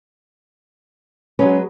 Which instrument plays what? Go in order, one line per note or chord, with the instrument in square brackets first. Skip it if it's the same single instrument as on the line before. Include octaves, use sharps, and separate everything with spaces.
[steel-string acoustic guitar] F#3 G#3 B4 [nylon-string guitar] C#4